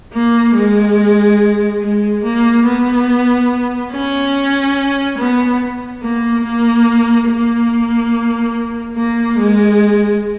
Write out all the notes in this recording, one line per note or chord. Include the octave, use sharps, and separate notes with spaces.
A#3
G#3
G#3
A#3
B3
C#4
B3
A#3
A#3
A#3
A#3
G#3